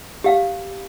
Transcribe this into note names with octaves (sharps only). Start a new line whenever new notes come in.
G4 F5